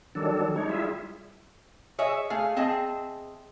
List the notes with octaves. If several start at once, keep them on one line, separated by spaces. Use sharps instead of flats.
D#3 F#3 G3 D4 A4
G#3 D4 D#4 C#5
G3 E4 F4 G#4 E5
G#4 C#5 D#5 E5
A3 G#4 F5
C4 G#4 D#5 E5 A5